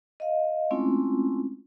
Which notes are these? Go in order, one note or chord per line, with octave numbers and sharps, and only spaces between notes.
D#5 F5
G#3 A3 C4 C#4 E4 F4